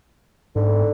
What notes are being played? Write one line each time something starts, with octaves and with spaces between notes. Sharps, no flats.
G#2 D3